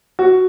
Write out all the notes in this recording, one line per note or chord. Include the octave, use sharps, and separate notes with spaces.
F#4